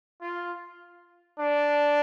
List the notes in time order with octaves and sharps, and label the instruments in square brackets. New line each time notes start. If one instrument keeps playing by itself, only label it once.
[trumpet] F4
D4